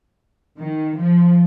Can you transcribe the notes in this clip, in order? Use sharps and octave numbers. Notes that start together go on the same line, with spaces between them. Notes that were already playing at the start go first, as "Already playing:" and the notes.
D#3
F3